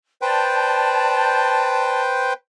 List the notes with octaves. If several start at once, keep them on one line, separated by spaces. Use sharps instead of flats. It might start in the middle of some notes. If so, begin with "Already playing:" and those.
B4 C5 D5 G5 A5